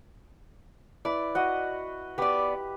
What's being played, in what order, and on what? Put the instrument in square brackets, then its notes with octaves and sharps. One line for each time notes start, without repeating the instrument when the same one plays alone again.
[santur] E4 B4 [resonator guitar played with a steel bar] D5
[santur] F#4 D#5 F#5
[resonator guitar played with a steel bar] B3 D5 [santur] G4 B4